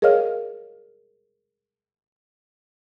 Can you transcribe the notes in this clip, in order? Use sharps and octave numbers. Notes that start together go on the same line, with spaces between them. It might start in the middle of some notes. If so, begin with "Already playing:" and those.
G#4 A#4 C#5 D#5 F5 F6